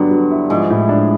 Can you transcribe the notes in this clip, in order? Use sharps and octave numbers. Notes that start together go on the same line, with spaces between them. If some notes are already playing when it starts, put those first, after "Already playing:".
Already playing: G2 D3 F#3 B3
F#3
E4
G#2 F3
A2
D4